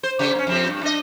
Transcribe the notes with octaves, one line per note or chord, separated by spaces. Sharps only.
C5
C#3 G4 C5
A#3 C#4
F2 C4 G4
G2
D4 D#5